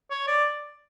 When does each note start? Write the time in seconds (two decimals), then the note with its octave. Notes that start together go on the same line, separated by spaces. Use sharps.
0.11 C#5
0.28 D5